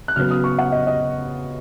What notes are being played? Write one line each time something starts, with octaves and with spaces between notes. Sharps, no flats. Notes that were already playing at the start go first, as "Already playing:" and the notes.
F#6
C#3 F#3 B3 F6
D#6
C#6
F#5
D#5
D#5